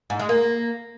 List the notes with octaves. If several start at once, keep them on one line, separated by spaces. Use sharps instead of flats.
G#2
G#3
A#3